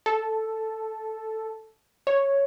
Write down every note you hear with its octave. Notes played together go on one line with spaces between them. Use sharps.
A4
C#5